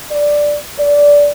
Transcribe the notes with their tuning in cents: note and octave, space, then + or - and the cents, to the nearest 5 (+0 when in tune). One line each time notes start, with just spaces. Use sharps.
D5 +0
D5 -15